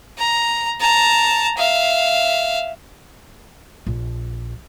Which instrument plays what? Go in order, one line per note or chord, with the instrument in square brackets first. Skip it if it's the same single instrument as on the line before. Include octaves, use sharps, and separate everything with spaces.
[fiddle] A#5
A5 A#5
E5 F5
[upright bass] A#1